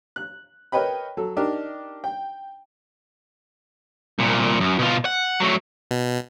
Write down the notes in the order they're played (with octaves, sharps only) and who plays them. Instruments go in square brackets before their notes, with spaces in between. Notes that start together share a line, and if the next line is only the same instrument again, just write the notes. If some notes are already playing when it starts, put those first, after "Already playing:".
[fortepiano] F#6
A#4 B4 C#5 D#5 G5 B5
F#3 A4
D4 D#4 G4 A#4
G5
[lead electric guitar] C2 A#2
F#2
B2 F4
F#5
F#3 A3
[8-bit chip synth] B2